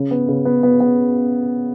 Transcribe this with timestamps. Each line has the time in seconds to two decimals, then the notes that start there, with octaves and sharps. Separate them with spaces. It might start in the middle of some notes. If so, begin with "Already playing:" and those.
Already playing: C#3
0.11 B3
0.28 C#3
0.45 B3
0.63 B3
0.80 B3